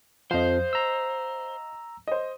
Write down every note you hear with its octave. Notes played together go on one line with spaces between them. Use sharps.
F2 F3 C5 D#5 F5
A#5 E6
C5 D#5